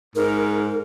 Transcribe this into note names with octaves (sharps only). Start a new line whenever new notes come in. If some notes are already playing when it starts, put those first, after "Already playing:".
G#2 A#4